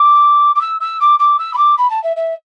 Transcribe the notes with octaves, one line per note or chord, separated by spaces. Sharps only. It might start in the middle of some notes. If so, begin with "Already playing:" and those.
Already playing: D6
D6
E6
E6
D6
D6
E6
B5
D6
B5
A5
E5
E5